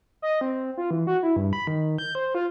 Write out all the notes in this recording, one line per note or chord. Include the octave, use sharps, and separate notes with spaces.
D#5
C4
F4
E3
F#4
E4
G2
B5
D#3
G6
C5
F4